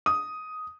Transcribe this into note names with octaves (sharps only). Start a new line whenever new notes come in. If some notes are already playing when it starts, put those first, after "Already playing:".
D#6